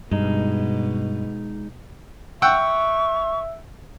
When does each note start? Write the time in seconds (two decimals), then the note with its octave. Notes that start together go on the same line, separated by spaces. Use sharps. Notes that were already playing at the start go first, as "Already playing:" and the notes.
0.11 G2 B2 G#3 D#4
2.42 E5 F#5 G5 C#6 E6